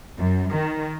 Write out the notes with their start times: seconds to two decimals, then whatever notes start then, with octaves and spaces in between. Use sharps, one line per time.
0.18 F#2
0.52 D#3